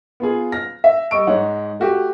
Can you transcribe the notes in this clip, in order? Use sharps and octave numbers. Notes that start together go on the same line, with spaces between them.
B3 F4 G#4
F6 A#6
E5
G3 D#5 C#6 E6 D7
G#2 D#4 C#5 F#5
A3 F#4 G4